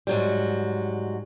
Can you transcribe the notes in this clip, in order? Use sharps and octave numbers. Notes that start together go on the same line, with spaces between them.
G#2 F#3 G3